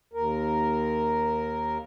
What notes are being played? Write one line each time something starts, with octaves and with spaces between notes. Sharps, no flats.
D#2 A#4